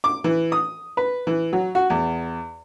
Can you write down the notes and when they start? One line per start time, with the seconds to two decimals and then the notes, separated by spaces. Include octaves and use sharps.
0.04 D6
0.24 E3
0.52 D#6
0.97 B4
1.27 E3
1.53 F#3
1.75 F#4
1.90 E2